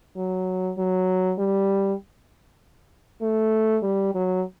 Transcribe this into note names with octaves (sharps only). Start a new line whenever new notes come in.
F#3
F#3
G3
A3
G3
F#3